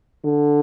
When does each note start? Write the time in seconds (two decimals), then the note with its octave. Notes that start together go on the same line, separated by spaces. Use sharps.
0.25 D3